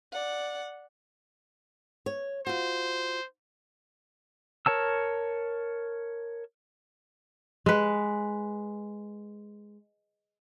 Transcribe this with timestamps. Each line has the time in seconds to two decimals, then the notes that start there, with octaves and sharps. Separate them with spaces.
0.12 D5 F#5
2.06 C#5
2.47 F4 F#4 C5
4.66 A#4 C#5 A5 E6
7.66 G#3 B4